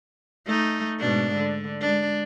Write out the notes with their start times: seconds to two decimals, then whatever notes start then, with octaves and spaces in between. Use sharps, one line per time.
0.46 A3 D#4
0.99 G#2 B2 D4
1.36 D3
1.81 G#3 D4